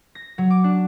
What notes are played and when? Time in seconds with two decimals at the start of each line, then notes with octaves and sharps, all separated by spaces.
0.15 A#6
0.38 F#3
0.50 D6
0.64 D4